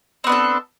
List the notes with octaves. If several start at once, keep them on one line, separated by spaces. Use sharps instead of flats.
B3 C4 D4 A4